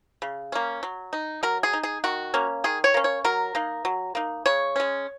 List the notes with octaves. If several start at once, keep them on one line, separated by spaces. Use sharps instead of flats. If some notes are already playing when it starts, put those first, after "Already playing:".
C#3
A#3 C#4
F#3
D#4
F#3 A#4
G#4
D#4
G#4
D#3 F#4
A#3 C#4
D#3 G#4
C#5
A#3 C#4
C#5
F#3 A#4
A#3 D#4
F#3
A#3 D#4
C#3 C#5
G#3 C#4